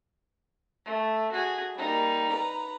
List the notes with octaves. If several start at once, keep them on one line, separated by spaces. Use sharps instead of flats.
A3
F#4 G#4
G3 A#3 D#4
B4 A#5